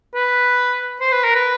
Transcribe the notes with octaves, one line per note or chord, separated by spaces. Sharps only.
B4
C5
B4
A#4
B4